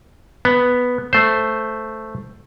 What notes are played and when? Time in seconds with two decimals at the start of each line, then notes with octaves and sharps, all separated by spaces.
0.45 B3
1.13 A3 C5